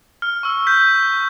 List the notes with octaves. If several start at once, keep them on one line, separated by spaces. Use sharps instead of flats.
F6
C#6 E6
F6 G6 B6